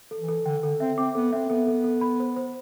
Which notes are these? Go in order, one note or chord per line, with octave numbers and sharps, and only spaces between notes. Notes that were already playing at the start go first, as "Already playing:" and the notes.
A4
E3
A4
D3 G5
D3 A4
C4 E5
C4 D6
B3 A4
C4 E5
B3 A4
A4
A4
B5
C5
C5